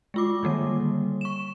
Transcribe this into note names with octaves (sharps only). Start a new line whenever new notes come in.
G#3 F4 D6
D3 D#3 G3 A#3
C#6 E7